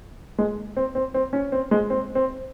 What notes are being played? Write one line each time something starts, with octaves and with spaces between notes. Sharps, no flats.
G#3
C4
C4
C4
C#4
C4
G#3
C4
C4